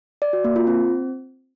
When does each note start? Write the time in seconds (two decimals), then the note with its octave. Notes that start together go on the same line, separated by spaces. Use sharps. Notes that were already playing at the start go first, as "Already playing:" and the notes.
0.22 D5
0.33 F#4
0.44 A#3
0.56 F4
0.67 C4